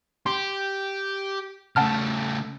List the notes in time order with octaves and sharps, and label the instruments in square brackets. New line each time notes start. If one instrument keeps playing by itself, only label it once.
[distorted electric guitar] G4 [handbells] C6
[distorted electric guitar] C#3 A3 [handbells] F#5 A5 F6